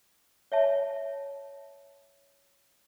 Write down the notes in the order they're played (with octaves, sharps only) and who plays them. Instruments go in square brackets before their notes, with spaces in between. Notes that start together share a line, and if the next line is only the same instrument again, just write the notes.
[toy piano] C#5 E5 A5